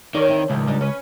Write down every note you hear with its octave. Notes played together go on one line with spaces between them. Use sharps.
D#3 A#4 C#5 D5
C4 E4
C#2 A2 D#3 F3
G3 D4 D#4
C#4 B4